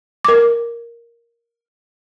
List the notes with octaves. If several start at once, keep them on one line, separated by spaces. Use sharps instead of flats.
A#4 D6